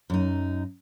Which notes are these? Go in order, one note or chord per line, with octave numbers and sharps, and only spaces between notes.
F#2 D#4